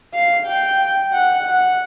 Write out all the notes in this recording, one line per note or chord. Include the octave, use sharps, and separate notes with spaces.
F5
G5
F#5
F#5